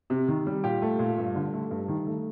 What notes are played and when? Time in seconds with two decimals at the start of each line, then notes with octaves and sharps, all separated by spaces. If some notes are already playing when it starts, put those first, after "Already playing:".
0.10 C3
0.28 D#3
0.47 G3
0.64 A#2 G4
0.82 A3
0.99 A#2
1.18 G2
1.36 D3
1.54 A3
1.71 G2
1.88 D#3
2.07 A3